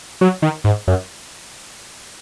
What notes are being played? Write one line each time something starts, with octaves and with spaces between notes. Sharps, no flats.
F#3
D#3
G#2
F#2